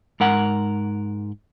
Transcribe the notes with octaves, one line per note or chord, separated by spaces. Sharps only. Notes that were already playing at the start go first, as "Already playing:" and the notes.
G#2 A#4 F#5